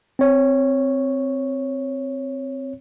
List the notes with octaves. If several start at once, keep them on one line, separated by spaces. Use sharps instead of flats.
C4 C#5